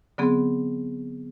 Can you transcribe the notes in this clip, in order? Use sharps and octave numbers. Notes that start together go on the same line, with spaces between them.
D3 F#3 B3 C4 G#4